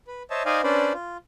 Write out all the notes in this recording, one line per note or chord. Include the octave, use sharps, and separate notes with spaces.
B4
C5 C#5 D#5 E5 A5
D#4 C5 D5 D#5 F5 G#5
C#4 D4 B4 C5 D5
F4